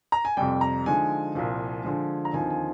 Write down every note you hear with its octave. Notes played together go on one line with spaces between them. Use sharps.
A#5
G#5
F2 C3 G3 G5
A#5
D3 F3 G#3 D#4 G#5
C2 A#2 F3
D3 F3 G#3
A#5
D#2 D3 F3 C4 D#4 G#5
G#5